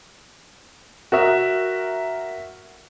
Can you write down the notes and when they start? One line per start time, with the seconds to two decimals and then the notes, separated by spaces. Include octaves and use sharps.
1.12 F#4 A#4 E5